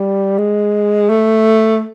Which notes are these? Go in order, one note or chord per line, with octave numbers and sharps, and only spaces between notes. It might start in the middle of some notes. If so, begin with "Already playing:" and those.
Already playing: G3
G#3
A3